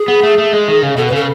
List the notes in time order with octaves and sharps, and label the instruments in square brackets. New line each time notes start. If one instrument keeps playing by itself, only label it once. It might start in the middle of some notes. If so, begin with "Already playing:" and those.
Already playing: [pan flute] G#4
[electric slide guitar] B3
A3
A3
G#3
D#3
C#3
[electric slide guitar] B2 [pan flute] A4
[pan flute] B4
[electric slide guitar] C#3 [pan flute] A4